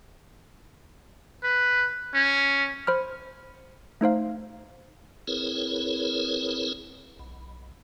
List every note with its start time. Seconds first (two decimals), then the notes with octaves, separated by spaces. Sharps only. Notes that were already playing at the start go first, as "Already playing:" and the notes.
1.43 B4
2.14 C#4
2.87 C5 B5 F6
4.01 A3 D#4 C5 F5
5.28 C4 E4 G#4 A#4 B4 C#5
7.19 B1